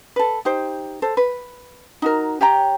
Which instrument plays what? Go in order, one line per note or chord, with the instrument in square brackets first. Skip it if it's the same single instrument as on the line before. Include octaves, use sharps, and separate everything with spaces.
[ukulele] A4 B4
D#4 G4 C5
A4 C5
B4
D#4 F#4 A#4
G4 C#5 G5 A#5